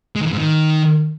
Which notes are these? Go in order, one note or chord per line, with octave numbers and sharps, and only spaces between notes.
G#3
D#3
E3
G#2
D#3